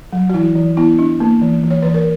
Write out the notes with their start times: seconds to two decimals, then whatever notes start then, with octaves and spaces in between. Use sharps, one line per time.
0.13 F#3
0.29 F#4
0.34 E3 E4
0.56 E3
0.77 B3 E4
0.99 D4
1.20 A#3
1.42 E3
1.63 E3
1.70 C#5
1.82 E3 B4
1.94 A#4